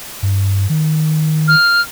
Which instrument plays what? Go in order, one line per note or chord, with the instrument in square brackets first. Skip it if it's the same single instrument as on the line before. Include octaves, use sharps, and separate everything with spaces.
[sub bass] G2
D#3
[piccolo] F6